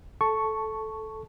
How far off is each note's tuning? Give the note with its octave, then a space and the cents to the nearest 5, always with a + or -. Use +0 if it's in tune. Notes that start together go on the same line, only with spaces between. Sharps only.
A4 -10 A5 +0 C#6 +0